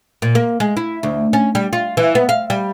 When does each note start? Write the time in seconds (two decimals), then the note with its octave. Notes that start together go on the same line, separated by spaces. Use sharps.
0.22 A#2
0.35 A#3
0.60 G#3
0.77 E4
1.03 D2
1.33 C#4
1.55 G3
1.73 F4
1.97 E3
2.15 B3
2.29 F5
2.50 G3